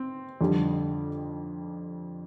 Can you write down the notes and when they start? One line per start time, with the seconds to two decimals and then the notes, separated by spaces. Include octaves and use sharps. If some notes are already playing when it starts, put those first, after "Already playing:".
Already playing: C4
0.41 F2 D3 G3